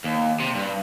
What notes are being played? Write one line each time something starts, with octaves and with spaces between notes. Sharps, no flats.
D#2
C3
G2